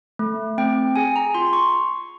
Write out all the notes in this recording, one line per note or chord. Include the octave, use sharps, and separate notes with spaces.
A3
C4 G5
G#4 G#5
A#5
F4 C6
C6
C#6